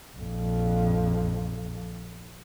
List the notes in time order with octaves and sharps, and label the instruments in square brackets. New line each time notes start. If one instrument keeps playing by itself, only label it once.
[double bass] A#1 F2